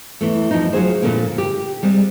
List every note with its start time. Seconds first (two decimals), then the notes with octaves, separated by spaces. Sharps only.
0.21 E2 E3 A3
0.51 F2 F3 D#4
0.73 F#3 F4 G#4 C5
1.02 F2 A#2 D3 A#3
1.38 G4
1.83 G3 G#3 C4